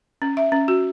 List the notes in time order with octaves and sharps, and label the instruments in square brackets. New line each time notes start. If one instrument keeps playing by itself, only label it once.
[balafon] C#4
E5
C#4
F#4